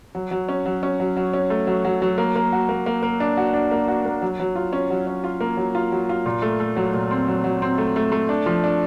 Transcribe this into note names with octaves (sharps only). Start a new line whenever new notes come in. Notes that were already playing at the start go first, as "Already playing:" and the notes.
F#3
F#3
C#4
F#3
C#4
F#3
F#3
C#4
A3
F#3
F#3
F#3
A#3
A#3
F#4
A#3
A#3
A#3
D4
F#4
D4
A#3
F#4
A#3
F#3
F#3
F4
C#4
F#3
C#4
F4
A#3
F#3
F4
F#3
F4
A#2
A3
A3
F#3
A#2
C4
F#3
F#3
C4
A3
A3
A3
D4
F3
D4